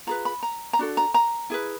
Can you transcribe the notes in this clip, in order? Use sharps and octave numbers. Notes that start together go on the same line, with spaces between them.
F4 G#4 B4 A#5
B5
A#5
A#5
D4 F#4 A4
A#5
A#5
E4 G#4 B4